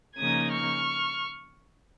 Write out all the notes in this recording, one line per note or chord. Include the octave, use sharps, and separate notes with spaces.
C#3 F3 A#3 D#4 D#6 G#6
C#6 F6